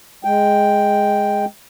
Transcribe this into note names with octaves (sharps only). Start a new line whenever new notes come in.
G#3 G5